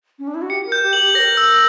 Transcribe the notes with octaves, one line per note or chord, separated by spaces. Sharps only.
C#4
D4
E4
F#4
G4 C#7
A#4
G6
G4
F#7
G4
A#4 C#5 A#6
E6